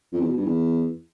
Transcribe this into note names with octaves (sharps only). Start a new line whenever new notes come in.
F2
E2
B2
G2
E2